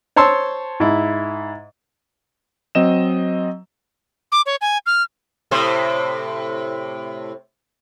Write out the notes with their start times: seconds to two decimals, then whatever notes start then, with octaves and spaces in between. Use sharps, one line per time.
0.16 C5 C#5 A5 C6 E6
0.80 G#2 E4
2.75 F#3 C4 D#5 E7
4.32 D6
4.46 C#5
4.61 G#5
4.86 F6
5.51 A2 C3 C5